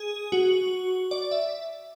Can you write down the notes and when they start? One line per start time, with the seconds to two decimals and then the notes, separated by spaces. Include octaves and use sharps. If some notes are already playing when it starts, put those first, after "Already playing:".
Already playing: G#4
0.32 F#4
1.11 D5
1.31 E5